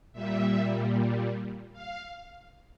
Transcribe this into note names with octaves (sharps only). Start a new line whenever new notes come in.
A#2 G3 E5
F5